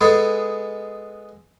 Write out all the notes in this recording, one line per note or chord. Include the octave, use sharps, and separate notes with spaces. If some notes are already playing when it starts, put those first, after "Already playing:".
G#3 B3 G#4 A4